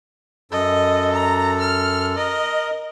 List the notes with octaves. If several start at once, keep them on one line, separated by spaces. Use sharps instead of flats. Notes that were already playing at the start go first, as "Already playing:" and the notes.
F#2 A4 D#5
A#5
F6
A#4 D#5